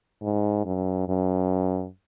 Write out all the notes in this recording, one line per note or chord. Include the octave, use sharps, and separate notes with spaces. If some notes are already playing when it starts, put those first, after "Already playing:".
G#2
F#2
F#2